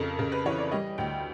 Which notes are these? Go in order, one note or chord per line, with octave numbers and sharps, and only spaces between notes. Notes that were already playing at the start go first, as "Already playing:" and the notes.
Already playing: F2 C#3 A4 A#4
C#3 A#4
B4
E3 C#5
D5
G3 D#5
D2 G5